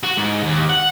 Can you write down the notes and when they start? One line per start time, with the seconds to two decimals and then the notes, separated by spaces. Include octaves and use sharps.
0.03 F#4
0.17 G#2
0.43 D#2
0.70 F#5